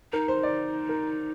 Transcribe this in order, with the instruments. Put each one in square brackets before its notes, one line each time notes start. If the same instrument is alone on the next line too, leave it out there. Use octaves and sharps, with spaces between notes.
[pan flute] D#4 [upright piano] A#4
[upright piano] C5
D5
A#4